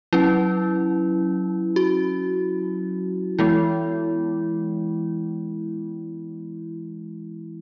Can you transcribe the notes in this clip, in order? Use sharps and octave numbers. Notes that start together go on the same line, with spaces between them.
F#3 C#4 E4
F#4
E3 G#3 B3 E4